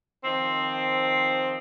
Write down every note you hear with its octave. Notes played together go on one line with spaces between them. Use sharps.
D#3 F3 C4